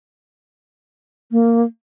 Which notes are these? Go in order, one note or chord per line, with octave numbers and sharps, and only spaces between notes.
A#3